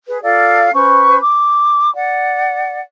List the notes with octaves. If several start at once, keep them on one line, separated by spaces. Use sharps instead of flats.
G#4 B4
F4 A4 D5 F5
C#4 B4 C5 C#6
D6
D5 F#5